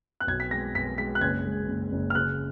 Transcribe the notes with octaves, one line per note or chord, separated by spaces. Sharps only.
F#6
B1 G#6
B6
G#3 A#6
B1 B6
G#3 B6
F#6
F#1 G#6
G#3
F#1
F#1
F6
C#3 F#6